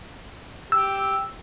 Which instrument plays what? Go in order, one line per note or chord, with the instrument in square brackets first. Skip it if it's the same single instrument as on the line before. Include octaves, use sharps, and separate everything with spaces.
[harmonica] G4 [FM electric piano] E6